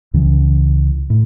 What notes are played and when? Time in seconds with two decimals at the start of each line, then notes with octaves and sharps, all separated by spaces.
0.14 C#2 C#3 E3
1.10 A2